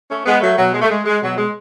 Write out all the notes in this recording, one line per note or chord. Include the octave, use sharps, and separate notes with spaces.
A3 C#4
G#3 B3
F#3 A3
B2 F#3
G#3
A3
G#3
G#3
B2 F#3
G#3